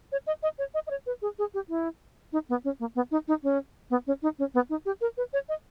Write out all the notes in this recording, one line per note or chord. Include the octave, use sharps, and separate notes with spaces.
C#5
D#5
D#5
C#5
D#5
D#5
C#5
B4
G#4
G#4
G4
E4
D#4
B3
C#4
A#3
B3
D#4
D#4
C#4
B3
C#4
D#4
C#4
B3
D#4
G4
A#4
B4
C#5
D#5